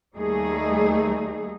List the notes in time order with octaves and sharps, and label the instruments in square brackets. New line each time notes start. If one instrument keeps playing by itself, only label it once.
[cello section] D#2 G3 A3 D#4 G#4